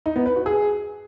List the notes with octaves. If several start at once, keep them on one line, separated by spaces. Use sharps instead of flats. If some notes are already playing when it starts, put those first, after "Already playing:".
D#4
B3
B4
F#4
G#4